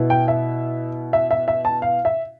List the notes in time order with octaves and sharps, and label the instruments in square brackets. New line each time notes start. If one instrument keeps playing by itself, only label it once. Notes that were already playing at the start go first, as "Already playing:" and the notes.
Already playing: [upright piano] B2 B3 E4
G5
E5
E5
E5
E5
A5
F5
E5